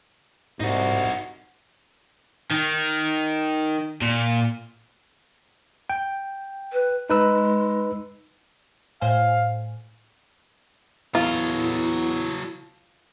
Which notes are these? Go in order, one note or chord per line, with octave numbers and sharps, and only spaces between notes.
C2 G#2 D#4 F#4
D#3
A#2
G5
B4
G#3 D#4 B4 E6
A2 C5 F5 G#5
E2 F#3 E4 F4 A4